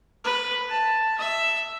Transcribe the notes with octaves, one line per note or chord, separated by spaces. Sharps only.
B4
A5
E5